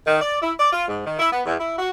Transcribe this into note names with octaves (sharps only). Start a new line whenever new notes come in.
D#3
D5
E4
D5
F4
G#2
D#3
E4
B3
E2
E4
F#4